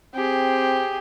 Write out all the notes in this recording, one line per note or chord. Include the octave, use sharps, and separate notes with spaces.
C4 G4 G#4